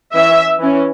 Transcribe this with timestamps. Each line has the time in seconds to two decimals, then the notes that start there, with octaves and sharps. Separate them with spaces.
0.14 E3 C#4 E5
0.59 E3 C#4